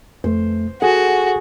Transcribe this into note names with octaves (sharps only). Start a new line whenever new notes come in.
F2 A3 C5
F#4 G#4 A4 F#5